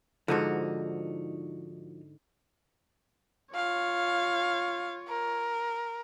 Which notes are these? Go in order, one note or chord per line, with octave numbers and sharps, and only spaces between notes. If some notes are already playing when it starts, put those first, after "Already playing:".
G#2 D3 F3 D#4 F#4
F4 C#5 F5
A#4